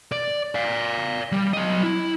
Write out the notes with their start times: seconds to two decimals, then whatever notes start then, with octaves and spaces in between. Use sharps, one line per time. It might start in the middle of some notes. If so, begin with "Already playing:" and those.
0.12 D5
0.55 D5 F5
1.32 G3
1.53 F#3 D#5
1.83 E4